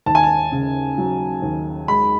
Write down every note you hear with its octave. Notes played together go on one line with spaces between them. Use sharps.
D#2 A5
G#5
A5
C#3
F#3
D#2
G#3 B5